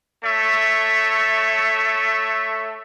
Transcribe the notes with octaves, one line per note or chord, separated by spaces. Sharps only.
A3 A4 C#5 E5